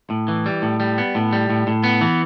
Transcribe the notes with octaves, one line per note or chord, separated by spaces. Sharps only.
A2
E3
G3
A2
G3
B3
A2
G3
A2
A2
B3
E3